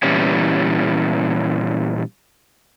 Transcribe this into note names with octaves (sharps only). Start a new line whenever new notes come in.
A#2 E3 G3 B3 C#4 E4